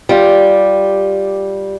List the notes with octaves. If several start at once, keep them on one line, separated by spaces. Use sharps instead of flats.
G3 F4 G4